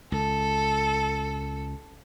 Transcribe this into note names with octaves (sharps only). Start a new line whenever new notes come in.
C#2 A4